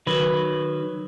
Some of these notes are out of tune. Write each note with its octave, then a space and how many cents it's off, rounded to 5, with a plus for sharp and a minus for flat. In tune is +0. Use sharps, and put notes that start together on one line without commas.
D#3 -25 F#3 -5 B4 +0